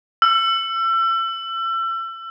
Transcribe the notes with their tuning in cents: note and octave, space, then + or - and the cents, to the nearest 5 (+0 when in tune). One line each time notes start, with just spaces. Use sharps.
E6 +35